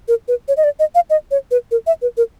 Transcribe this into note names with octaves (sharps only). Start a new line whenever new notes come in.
A#4
B4
C#5
D#5
D5
D#5
F5
D#5
C#5
B4
A#4
E5
B4
A#4